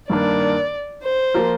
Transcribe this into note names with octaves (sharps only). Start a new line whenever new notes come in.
G2 D#3 A#3 D4 D5
C5
F3 A#3 F4 A#4